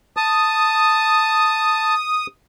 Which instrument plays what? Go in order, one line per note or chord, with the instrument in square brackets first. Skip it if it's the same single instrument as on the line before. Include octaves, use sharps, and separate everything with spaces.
[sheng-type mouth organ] A5 [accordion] D#6